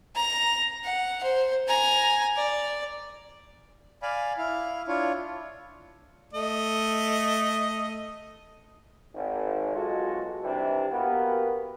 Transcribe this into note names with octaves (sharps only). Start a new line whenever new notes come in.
A#5
F#5
C5
G#5 A#5
D5
D5 F5 G#5 B5
E4 F5
D4 E4 F4 C#5
A3 D#5
G#1
B1 G#3 F4 F#4 A4
D#2 C3 E3 G3 D4 G4
A#3 B3 F#4 G4 A#4 B4